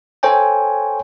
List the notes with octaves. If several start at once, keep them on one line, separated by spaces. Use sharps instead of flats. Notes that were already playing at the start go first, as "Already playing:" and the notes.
A4 C5 C#5 G5 G#5